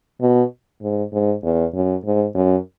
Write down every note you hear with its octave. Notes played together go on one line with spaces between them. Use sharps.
B2
G#2
G#2
E2
F#2
G#2
F#2